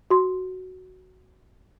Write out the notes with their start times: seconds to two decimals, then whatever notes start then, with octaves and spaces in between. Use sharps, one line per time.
0.11 F#4 C6